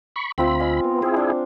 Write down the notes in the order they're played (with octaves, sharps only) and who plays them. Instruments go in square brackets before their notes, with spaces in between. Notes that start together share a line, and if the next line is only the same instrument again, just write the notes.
[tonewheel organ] B5 C#6
[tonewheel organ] D2 B5 [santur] C4 F4 E5
[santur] D#5 F5 G#5
[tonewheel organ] B3
[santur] C4 C5 [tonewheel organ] E4 G#4
[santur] D4